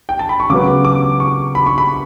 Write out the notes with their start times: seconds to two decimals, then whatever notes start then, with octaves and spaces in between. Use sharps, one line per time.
0.09 G5
0.19 A5
0.29 B5
0.40 C#6
0.49 C#3 F#3 B3 D6
0.85 D6
1.20 C#6
1.55 B5
1.66 C#6
1.78 B5